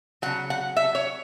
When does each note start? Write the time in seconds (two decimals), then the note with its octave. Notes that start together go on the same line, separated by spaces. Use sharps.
0.22 C#3 F#3 F#5
0.50 F#5
0.77 E5
0.95 C#5